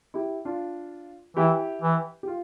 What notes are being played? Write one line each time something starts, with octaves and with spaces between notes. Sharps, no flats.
E4 G4
D4 F4
E3 E4 G4
E3
G4
F4